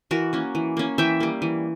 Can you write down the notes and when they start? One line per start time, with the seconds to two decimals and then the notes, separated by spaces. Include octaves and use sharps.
0.11 E3 F#4 A#4
0.33 A#3 C#4
0.55 E3
0.77 A#3 C#4
0.98 E3 E5 G5
1.20 G3 A#3
1.42 E3